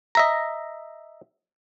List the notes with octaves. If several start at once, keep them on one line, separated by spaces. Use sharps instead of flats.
D#5 E5 A#5